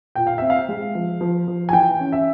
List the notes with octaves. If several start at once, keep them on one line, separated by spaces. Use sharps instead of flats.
A#2 G5
F5
C4 E5
F5
G#3
F3
F3
F3
G#5
E3 G5
C#4
E5